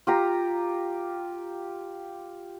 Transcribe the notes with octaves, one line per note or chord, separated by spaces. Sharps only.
F4 G4 A#5